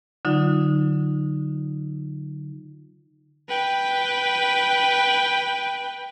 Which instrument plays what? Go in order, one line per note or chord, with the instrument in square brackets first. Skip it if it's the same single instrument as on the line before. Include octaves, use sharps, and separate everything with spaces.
[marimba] D3 F#3 D#4 F4
[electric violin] B4 G5